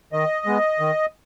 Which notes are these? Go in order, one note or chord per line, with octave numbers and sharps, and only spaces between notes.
D#3 D#5
G#3 B3
D#3